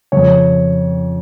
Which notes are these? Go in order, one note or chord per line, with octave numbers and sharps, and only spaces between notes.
F2 C#3 C#5